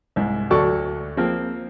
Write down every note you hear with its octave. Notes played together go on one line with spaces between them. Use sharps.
C2 G#2
D2 F#3 A4 D5 C#6
F3 A#3 C4